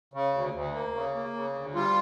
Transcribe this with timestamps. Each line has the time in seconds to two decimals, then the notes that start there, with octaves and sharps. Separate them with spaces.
0.14 C#3
0.33 D2
0.53 D2
0.74 A#3
0.94 C#3
1.15 A#3
1.34 C#3
1.54 D2
1.75 G3 F4